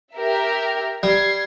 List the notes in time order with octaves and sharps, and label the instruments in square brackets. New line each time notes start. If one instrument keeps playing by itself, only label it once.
[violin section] G4 A#4 E5
[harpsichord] G3 [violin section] G#6 C7